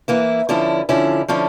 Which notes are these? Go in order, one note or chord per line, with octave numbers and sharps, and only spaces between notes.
E3 A#3 E4
D3 F3 C#4 E4
D3 F3 C#4 E4
D3 F3 C#4 E4